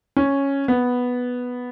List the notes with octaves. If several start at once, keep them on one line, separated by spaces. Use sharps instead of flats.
C#4
B3